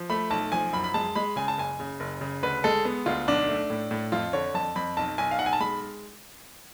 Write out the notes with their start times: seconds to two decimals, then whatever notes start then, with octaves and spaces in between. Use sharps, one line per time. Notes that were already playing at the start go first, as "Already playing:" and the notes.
Already playing: F3
0.10 A3 B5
0.30 B1 A5
0.52 F3 G#5
0.73 F#2 B5
0.84 B5
0.94 G#3 A5
1.15 G#3 B5
1.36 C#3 G#5
1.48 A5
1.58 F#1 G#5
1.80 C#3
2.00 F#1
2.21 C#3
2.43 D2 B4
2.64 G#3 A4
2.85 B3
3.06 D2 F4
3.28 B1 D4
3.49 A3
3.70 A2
3.91 A2
4.12 F2 F4
4.33 D3 C#5
4.54 F2 A5
4.76 F2 B5
4.97 B1 A5
5.18 B1 G#5
5.31 F5
5.39 B1 F#5
5.46 G#5
5.53 A5
5.60 G#3 B5